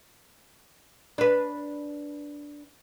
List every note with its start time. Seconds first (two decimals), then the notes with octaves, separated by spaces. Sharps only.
1.18 D4 B4